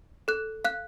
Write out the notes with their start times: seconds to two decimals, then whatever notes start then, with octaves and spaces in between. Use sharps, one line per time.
0.28 A4 F#6
0.65 F5 F#6